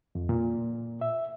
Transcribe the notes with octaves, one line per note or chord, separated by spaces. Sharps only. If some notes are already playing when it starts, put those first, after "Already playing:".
F2
A#2
E5